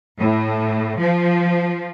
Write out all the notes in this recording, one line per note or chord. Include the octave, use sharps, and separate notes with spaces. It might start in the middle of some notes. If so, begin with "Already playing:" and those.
A2
F3